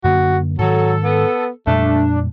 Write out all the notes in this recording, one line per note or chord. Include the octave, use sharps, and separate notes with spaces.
F#2 D3 A#3 F#4
G#2 D#3 F#3 A4
B3
F2 A#2 G3 A3 D4